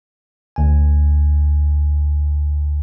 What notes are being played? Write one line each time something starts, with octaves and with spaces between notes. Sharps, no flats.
D2 G#5